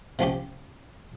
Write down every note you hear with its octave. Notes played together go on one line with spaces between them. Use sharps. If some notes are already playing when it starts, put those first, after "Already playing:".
C3 F3 C#4 G4